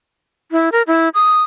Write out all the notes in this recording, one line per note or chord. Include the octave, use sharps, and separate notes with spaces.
E4
A#4
E4
D#6